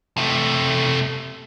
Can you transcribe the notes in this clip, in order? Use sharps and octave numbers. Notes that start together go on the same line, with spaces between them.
C3 A3